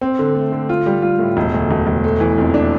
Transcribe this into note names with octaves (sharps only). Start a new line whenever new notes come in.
C4
D3
A3
D3
F4
G3
F4
A2
E1
D2
E1
E1
A3
E3
F2
D4